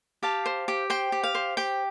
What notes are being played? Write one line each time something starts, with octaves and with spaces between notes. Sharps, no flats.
G4 F5 A5
C5
G4
C5 G5
G4
F5
C5
G4 G5